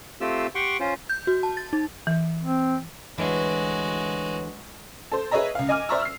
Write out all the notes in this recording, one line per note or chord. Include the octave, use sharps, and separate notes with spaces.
A3 C4 F4 G4 E6
G4 F#5 G5 C6 C#6
C#4 F4 C5
G6
F#4
A5
A6
D#4
E3
C4
D2 E3 G#3 D4 F#4 B4 C#5
A4 C5
G#4 B4 C#5 D#5 E5 A#5
C#2 F5
D#5 G#5 D6 F6
C5 D5 E5 A#5 C#6 E6
F6 C7